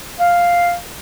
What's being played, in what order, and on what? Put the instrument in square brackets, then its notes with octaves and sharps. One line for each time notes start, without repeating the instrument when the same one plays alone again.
[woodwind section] F5